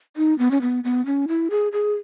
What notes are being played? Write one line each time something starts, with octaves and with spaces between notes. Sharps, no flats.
D#4
B3
C#4
B3
B3
C#4
E4
G#4
G#4